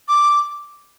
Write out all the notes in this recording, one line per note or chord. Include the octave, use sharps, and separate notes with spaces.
D6